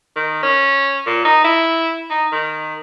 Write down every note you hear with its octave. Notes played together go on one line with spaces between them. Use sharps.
D#3
C#4
A#2
D#4
E4
D#4
D#3